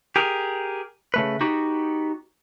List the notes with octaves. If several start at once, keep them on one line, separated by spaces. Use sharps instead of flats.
G4 G#4 A#4
C#3 A3 B4
B3 D#4 F#4 G4